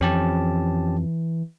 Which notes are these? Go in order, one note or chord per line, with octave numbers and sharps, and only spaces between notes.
F2 E3 C#4 G4 A5